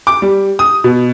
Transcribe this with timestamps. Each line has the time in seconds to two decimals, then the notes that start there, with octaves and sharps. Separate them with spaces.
0.07 D6
0.22 G3
0.59 D#6
0.84 B2